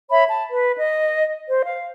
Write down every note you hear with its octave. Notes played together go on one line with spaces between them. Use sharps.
C#5 E5 B5
A5
B4
D#5
C5
F5